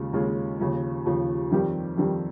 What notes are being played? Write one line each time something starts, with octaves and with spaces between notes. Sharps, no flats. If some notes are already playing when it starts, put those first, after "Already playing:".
Already playing: D#2 C#3 G#3 C#4 F4
D#2 C#3 G#3 C#4 F4
D#2 C#3 F3
D#2 C#3 F3
F2 D#3 G3 C4 G4
F2 D#3 G3 C4 G4